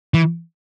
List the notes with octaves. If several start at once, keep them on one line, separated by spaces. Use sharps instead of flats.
E3